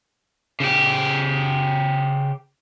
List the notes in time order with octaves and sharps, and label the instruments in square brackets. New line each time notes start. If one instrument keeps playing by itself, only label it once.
[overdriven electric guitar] C#3 G4